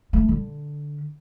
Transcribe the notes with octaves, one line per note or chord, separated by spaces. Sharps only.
A3
D3